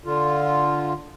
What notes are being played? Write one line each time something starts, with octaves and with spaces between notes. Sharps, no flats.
D3 F4